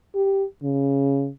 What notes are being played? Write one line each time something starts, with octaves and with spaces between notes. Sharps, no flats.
G4
C#3